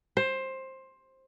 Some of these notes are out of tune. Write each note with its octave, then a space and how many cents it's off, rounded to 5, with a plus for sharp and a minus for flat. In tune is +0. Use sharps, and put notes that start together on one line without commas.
C5 +15